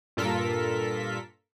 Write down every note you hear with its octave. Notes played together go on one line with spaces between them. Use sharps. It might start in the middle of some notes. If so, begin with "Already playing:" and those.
G2 A#2 F4 A4 A#4 B6